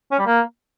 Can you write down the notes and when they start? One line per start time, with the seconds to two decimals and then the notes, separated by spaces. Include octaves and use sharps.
0.12 C#4
0.19 G3
0.26 A#3